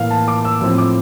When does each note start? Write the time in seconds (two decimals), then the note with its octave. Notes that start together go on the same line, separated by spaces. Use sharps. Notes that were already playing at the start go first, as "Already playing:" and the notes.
Already playing: A2 E3 A#3 F5
0.10 A5
0.28 D6
0.45 E6
0.61 A2 F3 C4 E6
0.78 D6